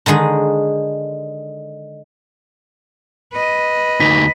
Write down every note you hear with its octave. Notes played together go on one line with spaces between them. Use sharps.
D3 D#3 G#3 G#4
B4 D#5
D2 D#4 B6